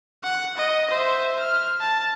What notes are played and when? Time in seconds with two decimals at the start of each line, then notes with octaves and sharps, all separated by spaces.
0.24 F#5
0.57 D#5
0.90 C5 E5
1.40 F6
1.80 A5